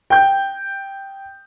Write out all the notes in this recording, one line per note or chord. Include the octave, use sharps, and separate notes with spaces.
G5 G6